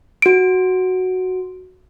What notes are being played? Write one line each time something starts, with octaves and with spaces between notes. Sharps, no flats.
F#4 D7